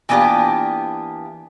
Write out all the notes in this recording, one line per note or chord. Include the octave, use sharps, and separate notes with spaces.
E3 A#3 B3 D4 F4 G4